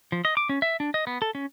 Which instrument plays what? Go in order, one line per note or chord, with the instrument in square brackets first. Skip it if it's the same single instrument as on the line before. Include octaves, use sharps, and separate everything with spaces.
[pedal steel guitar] F3
D#5
D6
C#4
E5
D4
D#5
B3
A4
C#4